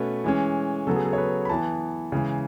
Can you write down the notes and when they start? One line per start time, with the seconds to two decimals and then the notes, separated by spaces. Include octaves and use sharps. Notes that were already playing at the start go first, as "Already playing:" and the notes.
Already playing: B2 A3 C#4 B4
0.24 E3 G#3 C#4
0.87 C#3 F#3 B3 A4
0.96 G#4
1.05 A4
1.13 C#5
1.18 B4
1.45 B5
1.49 E3 B3 A5
2.12 C#3 E3 G#3